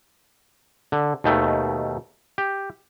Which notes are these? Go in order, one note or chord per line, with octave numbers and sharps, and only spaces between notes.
D3
D#2 B2 D#3 A3
G4